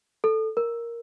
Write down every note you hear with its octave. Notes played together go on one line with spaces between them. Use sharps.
A4
A#4